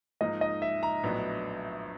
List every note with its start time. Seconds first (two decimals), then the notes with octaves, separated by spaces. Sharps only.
0.21 G#2 F3 A#3 D#4 D#5
0.41 D#5
0.62 E5
0.83 A#5
1.03 A#1 A2 F#3 B3 D4